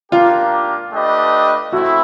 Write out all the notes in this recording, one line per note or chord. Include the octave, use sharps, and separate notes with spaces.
A#3 D4 F4 G4 A#4
A3 D4 G4 B4 D#5
A3 C4 E4 F#4